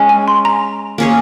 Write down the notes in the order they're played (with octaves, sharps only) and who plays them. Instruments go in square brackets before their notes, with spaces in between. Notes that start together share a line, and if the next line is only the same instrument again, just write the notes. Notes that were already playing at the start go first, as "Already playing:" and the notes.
Already playing: [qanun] G#3 C#4 G#4
[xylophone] G#5
C6
A#5
[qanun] A#3 C#4 G#4 C#5